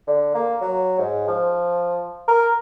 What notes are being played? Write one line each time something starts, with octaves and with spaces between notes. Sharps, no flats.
D3
A#3
F#3
G#2
F3
A#4